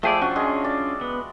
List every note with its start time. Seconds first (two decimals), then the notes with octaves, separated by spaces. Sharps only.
0.03 F3 A3 G#4 D5 E5 G5
0.22 C#4 D4 F4 F#4
0.36 G#3
0.64 D5
1.01 B3